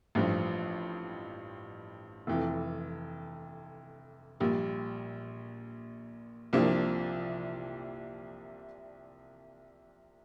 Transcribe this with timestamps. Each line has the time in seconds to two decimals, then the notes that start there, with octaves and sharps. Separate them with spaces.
0.15 A1 G2 F3
2.27 F1 F2 E3
4.40 A#1 A#2 G3
6.53 C2 C3 F3 A#3 D4